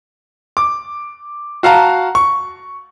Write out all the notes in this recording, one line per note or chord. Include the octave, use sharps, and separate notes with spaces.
D6
F#4 F5 A5 A#5
C#6